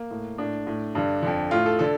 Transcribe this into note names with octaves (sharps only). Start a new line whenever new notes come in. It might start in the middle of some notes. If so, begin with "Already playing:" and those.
Already playing: A#3
A2
A2 D4
A2
G2 D3
F2 D3
A2 F4
A4
D3 A4